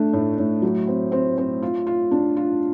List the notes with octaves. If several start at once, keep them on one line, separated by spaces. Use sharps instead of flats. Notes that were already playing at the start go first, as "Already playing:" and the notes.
Already playing: A3 D4
A2
A2
F#3
C4
C4
C4
F4
F4
D4
F4